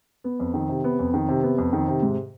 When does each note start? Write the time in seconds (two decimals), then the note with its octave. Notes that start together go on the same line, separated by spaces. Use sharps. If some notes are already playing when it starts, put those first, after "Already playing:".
0.24 B3
0.40 F2
0.54 D#3
0.69 C3
0.84 B3
0.99 F2
1.14 D#3
1.28 C3
1.43 B3
1.58 F2
1.73 D#3
1.88 C3
2.03 G#2